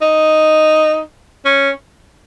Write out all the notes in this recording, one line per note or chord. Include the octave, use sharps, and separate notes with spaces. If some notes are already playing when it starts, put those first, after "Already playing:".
D#4
C#4